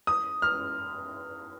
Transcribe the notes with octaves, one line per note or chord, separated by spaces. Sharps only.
D#6
F6